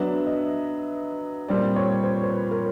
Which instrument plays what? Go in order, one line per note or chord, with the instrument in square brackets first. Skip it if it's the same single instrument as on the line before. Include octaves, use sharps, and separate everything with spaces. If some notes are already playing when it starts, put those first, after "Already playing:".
Already playing: [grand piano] F#3 B3 D4 [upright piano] E5
[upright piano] D#5
[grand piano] A#2 G3 C4 [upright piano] D5
[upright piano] C#5
C5
C5
B4
A#4